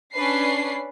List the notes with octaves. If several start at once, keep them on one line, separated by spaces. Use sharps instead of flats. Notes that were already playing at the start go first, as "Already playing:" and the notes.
C#4 D4 B4 C7